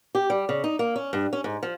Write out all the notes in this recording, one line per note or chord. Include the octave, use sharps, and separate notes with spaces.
G4
G3
C#3
D#4
A#3
C#4
G2
C#4
G#2
F3